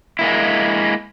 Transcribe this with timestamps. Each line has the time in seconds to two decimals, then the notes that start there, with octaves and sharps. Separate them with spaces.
0.19 G#3 A#3 E4